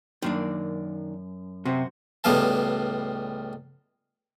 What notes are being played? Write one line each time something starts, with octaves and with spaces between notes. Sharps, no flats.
F#2 D#3 A#3 D4
C3 F#4 C5
C#2 A2 G3 B3 F5 A5